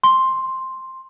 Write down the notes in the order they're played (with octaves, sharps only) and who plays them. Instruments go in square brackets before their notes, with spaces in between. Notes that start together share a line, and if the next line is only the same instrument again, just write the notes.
[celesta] C6